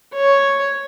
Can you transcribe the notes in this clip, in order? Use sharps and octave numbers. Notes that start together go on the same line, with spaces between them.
C#5